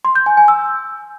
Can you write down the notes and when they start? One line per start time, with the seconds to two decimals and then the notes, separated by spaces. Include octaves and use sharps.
0.05 C6
0.15 G6
0.26 G#5
0.37 G#5
0.48 E6